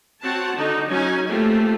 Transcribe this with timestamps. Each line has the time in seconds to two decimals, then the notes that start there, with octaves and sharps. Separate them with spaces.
0.22 C4 F#4 C#5 F#5 A5
0.56 D3 D#4 F#4
0.89 F#3 C#4 D#4 G#5
1.29 A3 A#3 C4 F4 G4